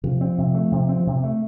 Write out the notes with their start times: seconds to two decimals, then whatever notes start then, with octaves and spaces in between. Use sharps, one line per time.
0.04 C3 F3
0.21 C4
0.38 C3
0.55 A3
0.72 C3
0.89 C4
1.07 C3
1.24 A3